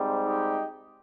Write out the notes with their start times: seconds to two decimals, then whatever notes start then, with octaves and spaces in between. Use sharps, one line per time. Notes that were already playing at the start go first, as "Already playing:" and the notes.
Already playing: G#2 G3 C4
0.24 D#4 G4